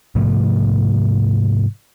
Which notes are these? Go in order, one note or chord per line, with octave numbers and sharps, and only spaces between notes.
G#2 C3 F3 A3